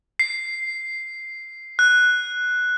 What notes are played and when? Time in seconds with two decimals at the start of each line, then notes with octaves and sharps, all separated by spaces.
0.20 C7
1.79 F#6